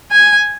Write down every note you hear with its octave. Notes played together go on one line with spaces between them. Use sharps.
G#5